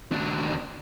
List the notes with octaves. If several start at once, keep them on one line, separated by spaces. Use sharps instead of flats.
D#2 D4